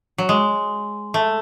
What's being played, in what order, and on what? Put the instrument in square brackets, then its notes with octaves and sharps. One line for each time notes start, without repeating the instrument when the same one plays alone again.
[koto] F#3
G#3
A3